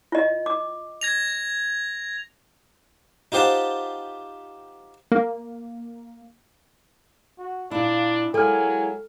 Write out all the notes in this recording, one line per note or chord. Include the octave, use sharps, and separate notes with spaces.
F4 D#5
D6
G#6 A#6 F7
D#4 F4 G4 C5 F#5 A5
A#3
F#4
A#2 D4 E4 F5
F#3 G#3 A#3 E4 A4 G#5 F6